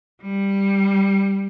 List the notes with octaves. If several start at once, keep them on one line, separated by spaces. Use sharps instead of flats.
G3